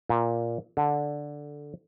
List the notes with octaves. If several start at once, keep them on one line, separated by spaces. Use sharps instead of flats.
A#2
D3